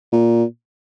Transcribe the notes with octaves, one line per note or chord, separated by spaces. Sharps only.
A#2